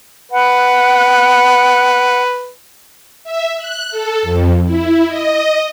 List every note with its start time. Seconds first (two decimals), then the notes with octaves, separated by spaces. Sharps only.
0.32 B4 F#5
3.24 E5
3.57 F#6
3.90 A4
4.22 F2
4.65 E4
5.07 D#5